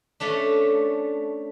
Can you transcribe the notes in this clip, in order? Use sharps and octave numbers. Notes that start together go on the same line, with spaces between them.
A3 C#4 D4